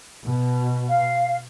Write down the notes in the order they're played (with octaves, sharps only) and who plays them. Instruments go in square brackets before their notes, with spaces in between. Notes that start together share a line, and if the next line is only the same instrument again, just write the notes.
[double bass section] B2
[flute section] F5